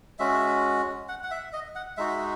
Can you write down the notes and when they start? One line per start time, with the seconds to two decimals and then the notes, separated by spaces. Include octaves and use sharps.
0.19 G#3 C#4 F#4 E5
1.08 F#5
1.24 F#5
1.31 E5
1.53 D#5
1.75 F#5
1.97 G#3 D#4 F#4 E5